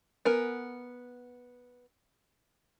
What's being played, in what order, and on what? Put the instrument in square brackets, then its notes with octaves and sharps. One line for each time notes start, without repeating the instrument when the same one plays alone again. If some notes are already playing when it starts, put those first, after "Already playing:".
[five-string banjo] B3 A#4 G#5